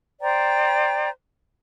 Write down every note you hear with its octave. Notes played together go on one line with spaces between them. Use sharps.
C5 D5 G5 A#5